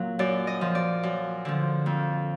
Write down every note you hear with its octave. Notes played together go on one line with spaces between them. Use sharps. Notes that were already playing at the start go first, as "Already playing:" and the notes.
Already playing: A#2 F#3
F#2 D5
D#5
F3
D5
F#2
D3 F3
F2